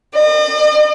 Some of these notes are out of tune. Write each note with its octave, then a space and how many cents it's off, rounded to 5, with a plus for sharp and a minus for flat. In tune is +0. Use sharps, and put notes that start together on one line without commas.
D#5 -45